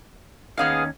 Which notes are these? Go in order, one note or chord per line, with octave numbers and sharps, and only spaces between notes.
D#2 B3 C#4 D#4 G#4 F5